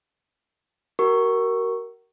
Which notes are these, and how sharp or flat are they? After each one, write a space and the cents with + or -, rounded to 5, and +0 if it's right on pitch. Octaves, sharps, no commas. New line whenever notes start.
F#4 +40 A#4 +0 C#6 +0